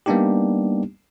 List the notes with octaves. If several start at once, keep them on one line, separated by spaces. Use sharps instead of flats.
G3 A#3 B3 D4 D#4 G4